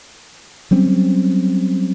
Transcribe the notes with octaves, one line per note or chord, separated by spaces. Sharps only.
F#3 G3 C4 C#4